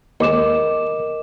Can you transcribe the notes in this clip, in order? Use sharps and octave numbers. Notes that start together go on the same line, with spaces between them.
D#2 G#3 A#4 D#5 D6 E7